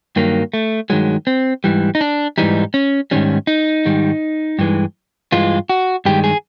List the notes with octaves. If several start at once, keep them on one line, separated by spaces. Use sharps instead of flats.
G2 D#3 F#3 A#3
A3
G2 D#3 F#3 G#3
C4
G#2 E3 G3
D#4
D4
G#2 E3 G3 D#4
C#4
G#2 D#3 G3 C#4
D#4
G#2 D#3 G3
G2 E3 G#3
G2 E3 G#3 F4
F#4
G2 D#3 G#3 G4
G#4